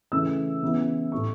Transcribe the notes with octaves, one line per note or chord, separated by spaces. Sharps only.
C#3 E3 A3 E4 E6
C#3 E3 B3 E4
A2 A3 E4 C#6